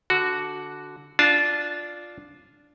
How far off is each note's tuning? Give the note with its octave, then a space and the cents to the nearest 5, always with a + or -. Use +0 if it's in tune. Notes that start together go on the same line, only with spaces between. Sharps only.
D3 -10 F#4 +0
D4 +0 F4 +0 A5 -25